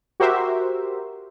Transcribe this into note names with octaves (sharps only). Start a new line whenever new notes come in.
F#4 G4 A#4 C5 E5